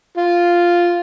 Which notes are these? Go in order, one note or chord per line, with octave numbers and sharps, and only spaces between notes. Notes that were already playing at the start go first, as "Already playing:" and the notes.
F4